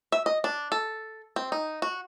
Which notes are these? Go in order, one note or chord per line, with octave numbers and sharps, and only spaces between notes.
E5
D#5
D4
A4
C4
D#4
F#4